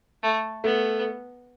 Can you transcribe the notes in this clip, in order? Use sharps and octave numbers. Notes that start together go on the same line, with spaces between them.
A3
A3 B3